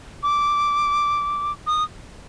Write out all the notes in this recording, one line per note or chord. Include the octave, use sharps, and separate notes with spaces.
D6
D#6